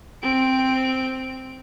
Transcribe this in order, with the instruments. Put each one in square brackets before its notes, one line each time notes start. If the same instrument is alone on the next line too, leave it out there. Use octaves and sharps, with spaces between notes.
[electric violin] C4 D7